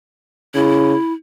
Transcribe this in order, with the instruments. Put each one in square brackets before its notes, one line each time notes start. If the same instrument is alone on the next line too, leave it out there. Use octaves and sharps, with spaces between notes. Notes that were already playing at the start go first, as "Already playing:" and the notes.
[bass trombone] C#3 [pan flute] E4